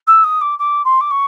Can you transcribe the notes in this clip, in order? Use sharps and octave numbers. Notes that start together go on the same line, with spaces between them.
E6
D#6
D6
D6
C6
D6
C#6